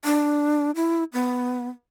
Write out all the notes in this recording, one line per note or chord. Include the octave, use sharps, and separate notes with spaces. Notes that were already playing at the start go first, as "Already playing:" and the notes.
D4
E4
B3